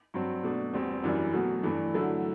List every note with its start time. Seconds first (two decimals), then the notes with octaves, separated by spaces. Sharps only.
0.14 G2 F#3 C4
0.43 B2 A3 D4
0.73 E2 B2 G3 C4
1.04 F#2 E3 G3 D4
1.34 B2 F#3 A3
1.63 G2 E3 A3 D4
1.94 D3 F#3 A3 E4